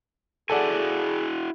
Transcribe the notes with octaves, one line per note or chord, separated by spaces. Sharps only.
E4 F#4 G#4 A4 D5 F#5 G#5